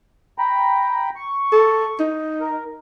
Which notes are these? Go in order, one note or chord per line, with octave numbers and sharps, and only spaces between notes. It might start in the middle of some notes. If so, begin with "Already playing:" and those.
G5 A#5 B5
C#6
A4
D#4
A#4